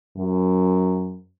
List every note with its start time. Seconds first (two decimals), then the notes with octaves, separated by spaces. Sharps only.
0.17 F#2